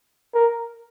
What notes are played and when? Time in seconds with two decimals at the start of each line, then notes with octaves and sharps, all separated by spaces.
0.34 A#4